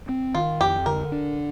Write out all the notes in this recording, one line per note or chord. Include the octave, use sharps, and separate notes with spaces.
C4
D#3 F4
F2 G4
D3 A#4
D4